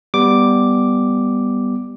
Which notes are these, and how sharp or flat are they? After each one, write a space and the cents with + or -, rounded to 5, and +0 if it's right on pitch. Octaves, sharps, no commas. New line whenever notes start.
G3 +5 B3 +0 D6 +0